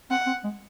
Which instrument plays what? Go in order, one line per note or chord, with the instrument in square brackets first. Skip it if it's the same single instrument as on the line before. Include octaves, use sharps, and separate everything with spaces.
[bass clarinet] C4 [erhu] F#5
[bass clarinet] C4
G#3